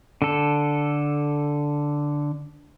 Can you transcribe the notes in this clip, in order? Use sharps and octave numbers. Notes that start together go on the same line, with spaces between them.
D3 A4